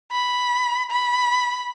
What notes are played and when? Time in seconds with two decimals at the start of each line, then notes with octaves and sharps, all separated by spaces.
0.12 B5
0.90 B5